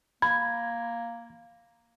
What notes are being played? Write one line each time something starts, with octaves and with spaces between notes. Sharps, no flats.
A#3 B5 G#6